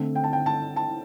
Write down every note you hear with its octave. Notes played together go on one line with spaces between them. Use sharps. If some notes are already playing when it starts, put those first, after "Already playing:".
Already playing: D3 A3 C4
G5
A5
G5
A5
A5